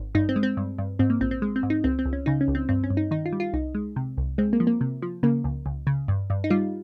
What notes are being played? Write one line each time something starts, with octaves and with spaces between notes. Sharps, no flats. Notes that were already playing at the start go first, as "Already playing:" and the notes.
Already playing: G#1
G2 D#4
C4
G#3
C4
G2
G2
G#2 C4
A#3
A#1 C4
C4
G#3
C4
G#2
D#4
C#2 C4
C4
C#2
C#4
C#3 D#4
C#4
C#2
C4
G2 C4
C#4
G2
D#4
D#3 D#4
F4
G3
F4
C2 D#4
G#3
C3
C2
G#3 C4
A#3
F3
A#3
C3
F3
C#3 A#3
C#2
C#2
C#3
G2
G2
D#4
G3 F4